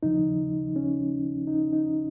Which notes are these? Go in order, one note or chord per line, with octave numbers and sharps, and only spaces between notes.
D#2 C#3 F3 D#4
C#4
D#4
D#4